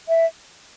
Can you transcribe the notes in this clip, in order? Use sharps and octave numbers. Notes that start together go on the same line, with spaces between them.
E5